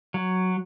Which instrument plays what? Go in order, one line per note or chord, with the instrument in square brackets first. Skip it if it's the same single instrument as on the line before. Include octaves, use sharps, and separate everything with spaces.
[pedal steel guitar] F#3